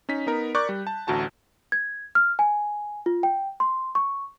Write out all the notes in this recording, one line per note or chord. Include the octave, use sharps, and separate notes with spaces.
C#4 D#4 B6
B3 D#4 A#4
A#4 D5 C#6 D6 F#6 G6
G3
A5
A1 D2 F#4 A5 A#5
G#6
F6
G#5
F4
G5
C6
C#6